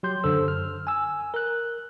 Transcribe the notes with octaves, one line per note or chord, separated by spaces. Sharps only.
F#3 G4 C6 G6
F#2 D3 A4 C5 E6
F6
G#5 E6
A#4 F#6